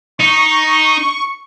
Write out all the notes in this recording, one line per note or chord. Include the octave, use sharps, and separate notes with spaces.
D#4 C#6